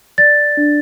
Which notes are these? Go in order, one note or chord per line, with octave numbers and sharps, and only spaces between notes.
D5 A6
D4